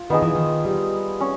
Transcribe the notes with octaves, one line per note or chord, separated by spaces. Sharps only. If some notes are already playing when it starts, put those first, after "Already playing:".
Already playing: F4
D#3 B3 D#4 G#4
E3
D#3
G3
C#4